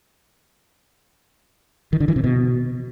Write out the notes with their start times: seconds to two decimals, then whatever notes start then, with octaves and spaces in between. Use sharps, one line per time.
1.93 D#3
2.00 D3
2.08 E3
2.16 C3
2.24 B2